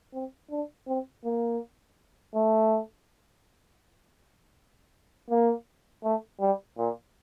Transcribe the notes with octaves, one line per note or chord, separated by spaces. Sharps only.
C4
D4
C4
A#3
A3
A#3
A3
G3
A#2